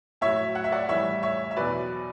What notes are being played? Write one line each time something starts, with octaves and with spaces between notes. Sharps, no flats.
A2 F#3 C#5 E5
F#5
E5
D5 F#5
A2 E3 G3 C#5 E5
C#5 E5
E5
E2 B2 F#3 B4 D5